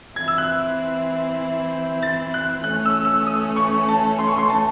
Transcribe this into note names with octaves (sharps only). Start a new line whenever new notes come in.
E3 C4 E4 G#6
E6
F#6
A6
F#6
E3 A3 C#4 F#6
E6
E6
D#6
C#6
A5
C6
C#6
C6
A5